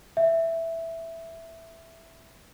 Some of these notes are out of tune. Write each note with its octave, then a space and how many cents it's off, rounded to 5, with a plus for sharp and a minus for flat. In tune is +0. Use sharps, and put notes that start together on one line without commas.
E5 +0